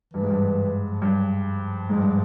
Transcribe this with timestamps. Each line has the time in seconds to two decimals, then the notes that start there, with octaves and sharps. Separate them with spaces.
0.14 G2 E3
0.22 G#2
0.30 G2
0.91 F3
1.02 G2 F#3
1.45 F3
1.89 G#2
1.98 G2